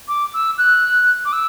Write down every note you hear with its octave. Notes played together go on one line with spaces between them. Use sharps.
D6
E6
F#6
D6
E6